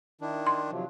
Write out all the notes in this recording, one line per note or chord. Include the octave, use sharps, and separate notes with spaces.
D#3 D4 E4
C6
C3 F3 F#3